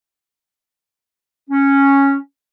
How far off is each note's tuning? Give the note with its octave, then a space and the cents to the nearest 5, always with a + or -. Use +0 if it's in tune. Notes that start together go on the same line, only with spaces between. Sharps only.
C#4 -5